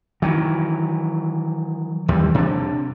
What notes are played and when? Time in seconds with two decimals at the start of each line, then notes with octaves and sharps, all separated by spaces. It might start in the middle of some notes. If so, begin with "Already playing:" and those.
0.22 D#3 E3 F#3
2.08 D#2 E3 G3
2.35 C3 D4